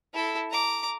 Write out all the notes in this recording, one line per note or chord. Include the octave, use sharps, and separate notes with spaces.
E4 A4
A#5 D6